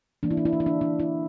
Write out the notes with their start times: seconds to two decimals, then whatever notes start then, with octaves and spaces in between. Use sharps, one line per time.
0.23 E3 A#3 D4
0.31 E4
0.37 D4
0.45 E4
0.53 D4
0.60 E4
0.66 D4
0.81 D4
1.00 E4